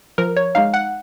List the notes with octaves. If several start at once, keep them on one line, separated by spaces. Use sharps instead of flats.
F3 A#4
C#5
G#3 D#4 F5
F#5